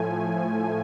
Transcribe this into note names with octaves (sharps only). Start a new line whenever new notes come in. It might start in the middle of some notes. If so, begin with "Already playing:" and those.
Already playing: A2 F3 A3 G#5